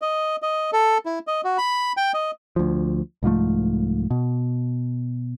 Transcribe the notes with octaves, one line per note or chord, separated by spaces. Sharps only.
D#5
D#5
A4
E4
D#5
F#4
B5
G5
D#5
D2 F3
C2 G#2 F3 A3
B2